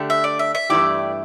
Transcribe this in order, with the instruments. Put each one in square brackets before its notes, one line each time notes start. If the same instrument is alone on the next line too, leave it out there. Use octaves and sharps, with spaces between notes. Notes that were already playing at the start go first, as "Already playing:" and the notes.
Already playing: [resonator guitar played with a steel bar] D3 A3 D4 G4
[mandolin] E5
D5
E5
E5
[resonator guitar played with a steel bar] G2 E3 A3 E4 G4 [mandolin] D5